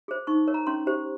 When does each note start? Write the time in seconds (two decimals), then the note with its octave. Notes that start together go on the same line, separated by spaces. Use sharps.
0.08 G#4 C5
0.27 D#4 C#6
0.48 A#4 C#5
0.54 A#5
0.67 C#4 C6
0.87 G4 C5